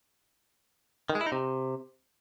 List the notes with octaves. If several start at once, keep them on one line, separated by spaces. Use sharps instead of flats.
D#3
G#3
E4
D#4
C3